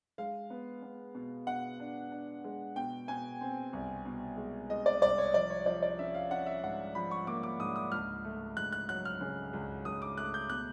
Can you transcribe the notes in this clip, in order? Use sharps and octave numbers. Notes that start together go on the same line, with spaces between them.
G#3 F5
B3
B3
B2
B2 F#5
D4
D4
G#3
B2 G5
B2 G#5
C4
C2
B2
G#3
G#3 D#5
D5
C2 D5
C#5
F3 D5
C#5
F3 D5
D5
C#4 E5
F5
C#4 F#5
E5
G#2 F#5
F3 B5
C#6
A#3 D6
D6
G#2 D#6
D#6
C#2 F6
A3
C#2 F#6
F#6
F#3 F#6
F6
C#3
C#2
C#2 D#6
D6
A3 F#6
G6
B2 F#6